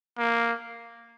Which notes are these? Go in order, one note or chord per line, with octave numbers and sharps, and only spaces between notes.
A#3